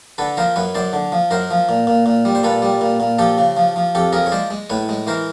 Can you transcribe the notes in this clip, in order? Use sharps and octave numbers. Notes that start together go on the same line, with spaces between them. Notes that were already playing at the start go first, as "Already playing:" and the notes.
D3 A4 B4
F3 A#4 C5
F#2 B4 C#5
F#2 C5 D5
D3
F3
F#2 A#4 C5
F3
A#2
A#2
A#2
G3
C5
A#2 A4 B4
G3
A#2
A#2
F3 G4 A4
C#3
F3
F3
F2 G4 A4
F3 G#4 A#4
C#5
G#3 C5 D5
G#3
A2 B4 C#5
G#3
E3 A#4 C5